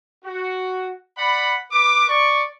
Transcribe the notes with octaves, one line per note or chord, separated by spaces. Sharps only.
F#4
D5 F#5 B5
B4 D6
D5 C#6